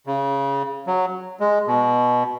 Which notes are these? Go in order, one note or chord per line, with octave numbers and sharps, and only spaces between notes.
C#3
F#3
G#3
B2